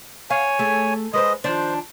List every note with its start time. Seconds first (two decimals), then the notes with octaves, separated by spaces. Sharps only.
0.30 C#5 F5 G#5
0.59 A3 G#4
1.13 G#3 B4 C5 D#5
1.44 D#3 F3 D4 C5